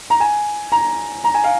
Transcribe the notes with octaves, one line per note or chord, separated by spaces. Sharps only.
A#5
G#5
A#5
A#5
G#5
F5